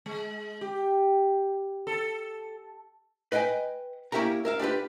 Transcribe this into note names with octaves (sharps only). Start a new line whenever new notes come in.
G#3
G4
A4
B4 D#5 F5 G5 G#5
A#3 C#4 E4 G4 A#4 A#5
A#4 E5 F5
D4 F4 G4 B4